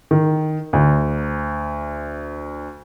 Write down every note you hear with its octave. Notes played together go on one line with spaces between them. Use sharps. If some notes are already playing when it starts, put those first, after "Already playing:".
D#3
D2